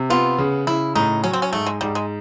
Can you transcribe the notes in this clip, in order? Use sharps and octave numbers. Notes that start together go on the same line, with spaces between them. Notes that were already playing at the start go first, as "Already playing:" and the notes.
Already playing: C3
B3 F4
C#3
C#3 E4
A2 D#4
F#3 C#4
C4
C#4
G#2 A3
G#3
G#2 G3
G#3